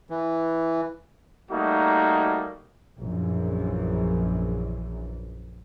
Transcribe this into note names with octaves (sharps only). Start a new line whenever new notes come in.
E3
G3 A3 A#3 D#4 F#4
A#1 F#2 E3